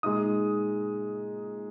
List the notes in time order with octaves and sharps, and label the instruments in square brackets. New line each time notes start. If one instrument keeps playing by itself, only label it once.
[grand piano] A#2 G#3 D#4 D#6